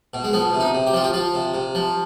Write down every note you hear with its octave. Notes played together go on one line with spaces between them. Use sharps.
B2
G#3
F3 B3
C3
D#4
C3
G4
F3 F4
G4
F3 F4
C3
C3
F3